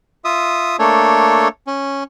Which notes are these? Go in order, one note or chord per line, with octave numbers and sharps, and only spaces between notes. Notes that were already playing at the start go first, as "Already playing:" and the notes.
F4 E5 D#6
A3 A#3 D4 A4 C#5
C#4